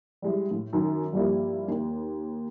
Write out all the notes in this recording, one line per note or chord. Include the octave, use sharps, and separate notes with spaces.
G3 G#3 E4
A2
F#2 D#3
G2 F3 G3 A#3 E4
D#2